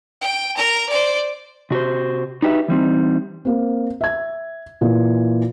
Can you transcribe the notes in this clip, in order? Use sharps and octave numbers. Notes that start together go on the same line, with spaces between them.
G5
A#4 A#5
C5 D5
C3 F#4 G4 C5
D#4 F#4 G4 B4 D5 E5
E3 G3 C4 D#4
A#3 C4
E5 G#6
A#2 E3